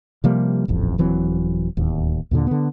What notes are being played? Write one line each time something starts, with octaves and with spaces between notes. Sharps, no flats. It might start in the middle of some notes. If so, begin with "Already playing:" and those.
C3 F3 G3 A#3
D#1 A1 F2
D#1 E3 F#3 C4
D1 D#2
D#2 A#2 D3
D3 B3